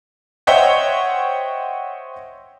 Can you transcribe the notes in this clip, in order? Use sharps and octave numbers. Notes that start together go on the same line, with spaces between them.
C5 C#5 D#5 E5 F#5 G5